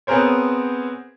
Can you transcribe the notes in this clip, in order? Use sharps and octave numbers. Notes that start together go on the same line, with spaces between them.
B3 C4 G#4 A#4 C5 C#5